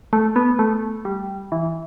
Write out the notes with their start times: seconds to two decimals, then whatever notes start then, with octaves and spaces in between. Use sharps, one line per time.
0.13 A3
0.36 B3
0.59 A3
1.05 G3
1.52 E3